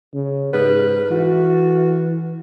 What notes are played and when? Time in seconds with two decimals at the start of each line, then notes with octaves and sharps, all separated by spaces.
0.14 C#3
0.54 G#2 B4
1.11 E3 F#4